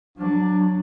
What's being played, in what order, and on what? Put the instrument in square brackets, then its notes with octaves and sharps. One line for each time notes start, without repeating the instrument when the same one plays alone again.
[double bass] F#3 [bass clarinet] D4